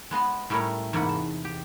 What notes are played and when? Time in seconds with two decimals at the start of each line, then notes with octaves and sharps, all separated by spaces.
0.11 G#3 B3 D#5 C6
0.50 A2 G3 A3 C#4 A#4 C#5
0.93 E2 G#2 C3 A#3 F#5 B5
1.09 A5
1.45 G4